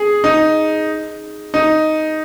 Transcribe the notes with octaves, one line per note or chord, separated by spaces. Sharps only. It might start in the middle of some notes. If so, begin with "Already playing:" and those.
Already playing: G#4
D#4
D#4